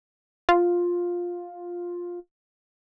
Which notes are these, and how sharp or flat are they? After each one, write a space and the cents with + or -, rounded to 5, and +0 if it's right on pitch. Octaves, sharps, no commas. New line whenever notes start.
F4 +10